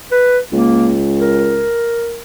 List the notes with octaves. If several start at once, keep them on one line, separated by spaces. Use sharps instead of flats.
B4
C#2 A#3
A#4